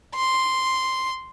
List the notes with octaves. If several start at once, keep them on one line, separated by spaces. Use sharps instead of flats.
C6